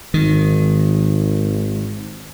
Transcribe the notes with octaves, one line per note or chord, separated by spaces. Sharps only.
G#1 D#3